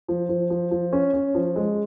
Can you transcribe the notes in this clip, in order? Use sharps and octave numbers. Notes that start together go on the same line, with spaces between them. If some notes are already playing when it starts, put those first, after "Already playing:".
F3
F3
F3
F3
C#4
C#4
F3
G#3